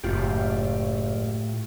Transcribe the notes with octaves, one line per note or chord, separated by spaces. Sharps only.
F#1 A2 F4 G4